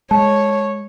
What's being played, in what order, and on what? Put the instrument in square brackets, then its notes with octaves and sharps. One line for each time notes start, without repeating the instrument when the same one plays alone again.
[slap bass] G#3 [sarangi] C#5 [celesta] A5